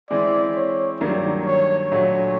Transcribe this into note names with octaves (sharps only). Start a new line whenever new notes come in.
E3 G#3 C4 E4 D5
C#5
G2 D#3 F#3 A#3 D5
C#5
A#2 F#3 A3 D4 F#4 C#5